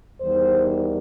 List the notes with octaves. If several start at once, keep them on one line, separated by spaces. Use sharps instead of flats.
E2 D#3 G3 C5